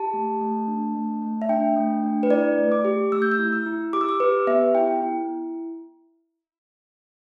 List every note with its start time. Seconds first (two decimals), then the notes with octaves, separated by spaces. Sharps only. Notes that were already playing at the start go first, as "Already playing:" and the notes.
Already playing: G4 A5
0.13 A3
0.41 A3
0.68 D4
0.95 A3
1.22 A3
1.42 E5
1.49 D4 G5
1.76 A3
2.04 D4
2.23 B4
2.30 E4 D5
2.58 A3
2.72 D6
2.85 G4
3.12 A3 E6
3.22 G6
3.32 E6
3.39 E4
3.52 E6
3.66 E4
3.93 G4 D6
4.01 E6
4.09 D6
4.20 G4 B4
4.47 B3 E5
4.75 E4 G5
5.02 E4